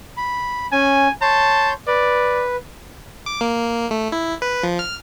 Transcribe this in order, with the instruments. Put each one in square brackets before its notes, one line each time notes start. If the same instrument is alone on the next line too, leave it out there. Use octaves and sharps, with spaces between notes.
[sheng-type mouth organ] B5
[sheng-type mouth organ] C#4 [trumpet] G#5
[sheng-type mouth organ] C#5 C6 G6 [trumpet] A5
[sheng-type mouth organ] B4 [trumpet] D5
[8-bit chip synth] D6
A#3
A3
E4
B4
F3
F6